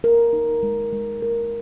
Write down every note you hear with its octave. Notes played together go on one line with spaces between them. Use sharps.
A#4
D#4
G#3
G#3
A#4